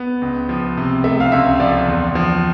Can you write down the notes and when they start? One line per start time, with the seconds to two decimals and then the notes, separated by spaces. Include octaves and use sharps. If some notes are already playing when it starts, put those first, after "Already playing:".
Already playing: B3
0.22 C#2
0.49 F3
0.78 C3
1.04 A3 E5
1.20 F5
1.32 C#2 E5
1.60 F3 D5
1.88 E2
2.15 F3